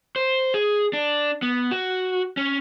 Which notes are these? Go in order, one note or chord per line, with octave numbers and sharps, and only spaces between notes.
C5
G#4
D4
B3
F#4
C#4